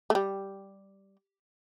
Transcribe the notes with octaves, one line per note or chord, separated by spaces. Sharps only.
A3
G3